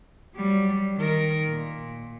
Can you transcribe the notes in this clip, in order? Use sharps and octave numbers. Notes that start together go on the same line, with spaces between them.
F#3 G3
D#3 A#4
A#2